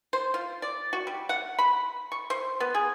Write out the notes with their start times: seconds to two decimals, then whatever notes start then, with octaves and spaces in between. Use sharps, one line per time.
0.13 C5
0.34 F4
0.62 D5
0.93 F#4
1.07 G3
1.29 F#5
1.59 B5
2.12 C#6
2.30 C5
2.60 B3
2.75 G#4